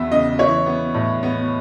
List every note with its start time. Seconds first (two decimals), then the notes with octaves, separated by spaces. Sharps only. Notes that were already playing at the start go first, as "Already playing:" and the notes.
Already playing: E2 E3 B3 E5
0.11 C#3 D#5
0.39 E3 C#5
0.66 B3
0.94 A2
1.23 B3